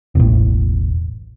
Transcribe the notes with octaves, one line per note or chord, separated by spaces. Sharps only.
E1 A1